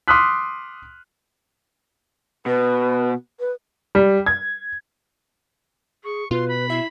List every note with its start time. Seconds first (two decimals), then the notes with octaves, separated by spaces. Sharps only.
0.08 C6 D6 D#6 F6 F#6 B6
2.46 B2 B4
3.40 B4
3.95 G3
4.26 G#6
6.04 G#4 C#6
6.31 B2 F4 B4 C6
6.48 B5
6.69 E4 E5 C7